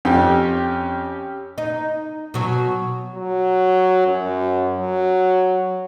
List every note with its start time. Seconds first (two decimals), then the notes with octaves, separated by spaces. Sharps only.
0.05 F2 C#4 G4
1.58 D#4
2.34 B2 F#3
3.16 F#3
4.07 F#2
4.78 F#3